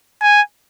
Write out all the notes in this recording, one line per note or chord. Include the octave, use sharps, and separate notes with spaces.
G#5